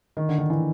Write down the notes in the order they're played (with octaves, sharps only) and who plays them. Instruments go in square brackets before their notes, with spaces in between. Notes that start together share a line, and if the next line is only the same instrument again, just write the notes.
[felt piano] D#3
D3
D#3
E3